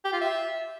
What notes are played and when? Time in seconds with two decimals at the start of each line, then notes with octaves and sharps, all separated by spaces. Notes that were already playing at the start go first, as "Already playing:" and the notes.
0.05 G4
0.13 F4
0.21 E5